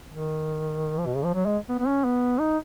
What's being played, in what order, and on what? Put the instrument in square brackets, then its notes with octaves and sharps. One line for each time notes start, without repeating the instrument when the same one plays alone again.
[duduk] D#3
F3
B2
C#3
F3
F#3
G#3
B3
B3
C#4
B3
D#4